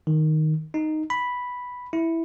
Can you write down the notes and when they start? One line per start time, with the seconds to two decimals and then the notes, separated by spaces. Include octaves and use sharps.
0.07 D#3
0.74 D#4
1.10 B5
1.93 E4